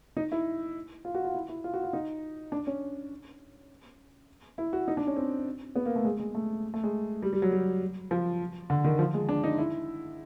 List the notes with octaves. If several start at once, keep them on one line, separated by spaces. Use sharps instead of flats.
D#4
E4
F4
F#4
F4
E4
E4
F4
F#4
F4
D#4
D4
C#4
E4
F#4
D#4
D4
C#4
C4
B3
A#3
A3
G#3
G#3
A3
A3
G#3
G3
G3
F#3
G3
F3
D3
D#3
F3
G#3
D4
D#4
E4